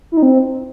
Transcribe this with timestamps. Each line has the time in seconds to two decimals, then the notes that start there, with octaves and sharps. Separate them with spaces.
0.12 E4
0.17 D#4
0.22 C4